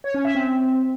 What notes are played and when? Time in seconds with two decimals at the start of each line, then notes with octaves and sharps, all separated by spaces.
0.04 C#5
0.14 C#4
0.25 E5
0.35 C4